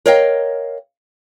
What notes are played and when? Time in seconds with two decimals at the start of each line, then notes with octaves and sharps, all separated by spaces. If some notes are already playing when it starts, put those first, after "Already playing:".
0.06 A#4 C#5 D#5 F5 G5